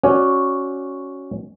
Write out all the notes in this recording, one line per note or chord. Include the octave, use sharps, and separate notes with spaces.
C#4 F#4 C#5 D5